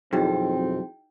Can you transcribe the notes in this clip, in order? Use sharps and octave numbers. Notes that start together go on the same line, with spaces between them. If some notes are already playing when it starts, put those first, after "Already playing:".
B1 F2 C4 D#4 E4 F#4 G#4 G5